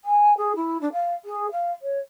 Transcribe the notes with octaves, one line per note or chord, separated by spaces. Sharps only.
G#5
G#4
E4
D4
F5
G#4
F5
C#5